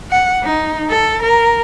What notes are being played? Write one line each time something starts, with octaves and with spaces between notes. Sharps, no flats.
F#5
D#4
A4
A#4